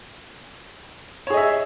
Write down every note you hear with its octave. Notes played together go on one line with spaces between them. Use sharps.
G#4 C#5 D#5 E5